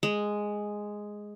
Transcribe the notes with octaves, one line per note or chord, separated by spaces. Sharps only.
G#3